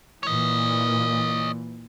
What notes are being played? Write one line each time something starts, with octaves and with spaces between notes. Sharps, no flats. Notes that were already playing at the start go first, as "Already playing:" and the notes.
A#2 E3 C#5 D#5